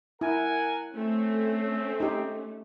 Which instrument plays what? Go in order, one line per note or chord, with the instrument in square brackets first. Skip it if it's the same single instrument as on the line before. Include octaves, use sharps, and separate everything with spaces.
[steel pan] E4 [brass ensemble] A#4 F#5 G#5
[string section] A3 C#4 [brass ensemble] C4
[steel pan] D#4 G4